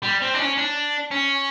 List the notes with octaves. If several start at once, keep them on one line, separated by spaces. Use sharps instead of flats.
G3
C4
D4
C#4
D4
C#4